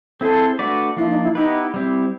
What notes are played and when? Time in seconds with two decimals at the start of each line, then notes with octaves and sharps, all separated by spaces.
0.21 C4 E4 G#4 A4 C5
0.59 A3 D4 F#4 B4 D5
0.97 F3 A#3 D4 E4 F4
1.10 D#4
1.23 E4
1.35 B3 D#4 E4 G4 B4
1.74 G3 C4 E4